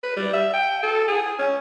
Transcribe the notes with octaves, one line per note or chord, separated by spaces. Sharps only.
B4
G3
E5
G5
A4
G#4
C#4